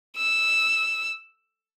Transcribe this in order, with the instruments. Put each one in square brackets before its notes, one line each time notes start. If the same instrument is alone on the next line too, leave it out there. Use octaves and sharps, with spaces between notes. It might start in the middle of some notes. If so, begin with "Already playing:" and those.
[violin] E6